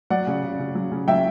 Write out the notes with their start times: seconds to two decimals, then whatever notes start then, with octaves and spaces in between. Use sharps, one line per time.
0.10 F#3 D5 F#5
0.27 C#3
0.43 C#3
0.59 C#3
0.75 F#3
0.92 C#3
1.07 F#3 E5 G5